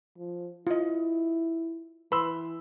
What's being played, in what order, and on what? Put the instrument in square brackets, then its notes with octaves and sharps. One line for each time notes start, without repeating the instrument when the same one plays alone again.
[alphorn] F3
[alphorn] E4 [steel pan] F4 D#5
[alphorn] E3 [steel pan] B4 [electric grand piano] B5 C6 E6